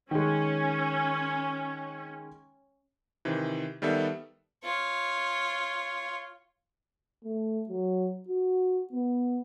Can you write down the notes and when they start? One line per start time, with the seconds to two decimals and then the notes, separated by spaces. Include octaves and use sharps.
0.11 D#3 G#3 C#4
3.25 C3 D#3 E3
3.82 D#3 G3 B3 A4 E5
4.64 F4 C#5
7.24 A3
7.69 F#3
8.28 F#4
8.92 B3